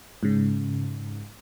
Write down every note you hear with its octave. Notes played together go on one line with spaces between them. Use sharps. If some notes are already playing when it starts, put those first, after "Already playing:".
G#2 C#3